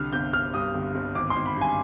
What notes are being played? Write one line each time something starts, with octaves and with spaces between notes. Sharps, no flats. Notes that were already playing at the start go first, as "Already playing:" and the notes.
Already playing: C2 D3 F6
G1 G6
G1 F6
G2 D#6
G1
G1
G#1 D6
C6
G#1
B5
G2
G#5